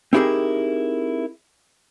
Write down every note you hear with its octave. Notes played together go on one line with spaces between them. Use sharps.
C4 D#4 E4 G4 G#4 A#4